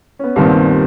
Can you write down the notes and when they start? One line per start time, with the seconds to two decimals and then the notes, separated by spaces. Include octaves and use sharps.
0.19 B3 C#4
0.36 C2 G2 A#2 D#3 B3 C4